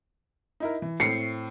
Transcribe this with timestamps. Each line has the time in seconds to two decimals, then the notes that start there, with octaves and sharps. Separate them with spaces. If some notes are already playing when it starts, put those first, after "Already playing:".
0.60 D#4 E4 A#4
0.82 E3
1.00 A2 C4 C7 C#7